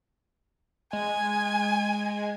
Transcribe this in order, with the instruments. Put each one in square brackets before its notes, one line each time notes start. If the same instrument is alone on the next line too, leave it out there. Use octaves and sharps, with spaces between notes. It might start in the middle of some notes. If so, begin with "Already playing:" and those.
[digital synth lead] G#3 [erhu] G#5